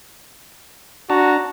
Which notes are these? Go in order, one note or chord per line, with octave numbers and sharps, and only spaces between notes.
D4 F#4 A5 A#5